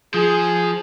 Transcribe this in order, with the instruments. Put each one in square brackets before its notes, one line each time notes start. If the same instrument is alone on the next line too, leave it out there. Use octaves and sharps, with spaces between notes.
[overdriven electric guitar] F3 [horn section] G#4